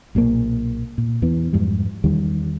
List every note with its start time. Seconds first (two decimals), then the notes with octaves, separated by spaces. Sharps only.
0.15 B1 A#2 D#3 A#3
0.98 A#2
1.22 E2 E3 B3
1.53 F2 G#2 G3
2.04 E2 D#3 G3